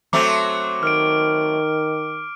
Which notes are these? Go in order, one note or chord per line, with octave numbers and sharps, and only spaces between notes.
F#3 A3 C4 D6
D#3 F6 D7